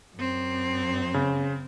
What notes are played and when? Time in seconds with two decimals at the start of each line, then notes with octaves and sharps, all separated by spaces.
0.16 F#2 C4
1.14 C#3